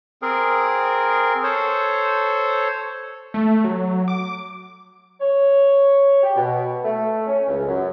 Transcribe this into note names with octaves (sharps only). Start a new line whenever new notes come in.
C4 G#4 A#4
A4 C5 C#5
A3
F#3
D6
C#5
G4
B2
A3
C#4
C#2
F#2